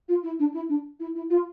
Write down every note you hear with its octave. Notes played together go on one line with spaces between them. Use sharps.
F4
E4
D4
E4
D4
E4
E4
F4